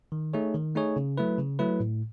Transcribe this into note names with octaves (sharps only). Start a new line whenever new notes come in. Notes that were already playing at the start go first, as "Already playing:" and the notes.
D#3
A3 D#4 G#4 C#5
D#3
A3 D#4 G#4 C#5
C#3
F#3 A3 E4 B4
C#3
F#3 A3 E4 B4
A2